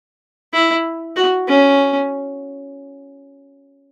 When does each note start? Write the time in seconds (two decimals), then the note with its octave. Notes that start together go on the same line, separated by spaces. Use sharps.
0.53 E4
1.16 F#4
1.48 C#4